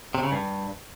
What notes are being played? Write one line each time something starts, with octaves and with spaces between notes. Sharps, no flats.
C3
C#3
G2